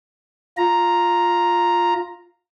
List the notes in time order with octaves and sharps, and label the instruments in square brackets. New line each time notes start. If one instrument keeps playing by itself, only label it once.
[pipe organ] F4 A#5